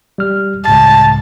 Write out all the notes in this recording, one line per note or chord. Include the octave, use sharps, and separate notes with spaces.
G3 F6
C#2 A2 A5 A6